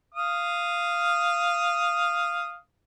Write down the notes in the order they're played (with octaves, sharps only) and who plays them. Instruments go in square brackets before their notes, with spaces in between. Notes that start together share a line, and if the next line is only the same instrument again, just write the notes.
[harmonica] F5 D#6